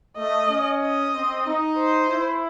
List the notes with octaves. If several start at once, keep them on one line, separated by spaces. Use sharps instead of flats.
A3 D#5
C#4
D#5
C4
D#4
C5
E4